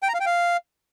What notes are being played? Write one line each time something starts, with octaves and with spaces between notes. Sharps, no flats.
G5
A#5
F5
G5
F5